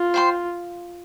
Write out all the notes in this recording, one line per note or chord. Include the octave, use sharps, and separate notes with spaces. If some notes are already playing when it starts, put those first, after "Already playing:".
Already playing: F4
C5 G5 C6